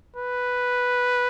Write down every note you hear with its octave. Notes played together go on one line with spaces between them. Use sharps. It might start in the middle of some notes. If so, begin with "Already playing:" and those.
B4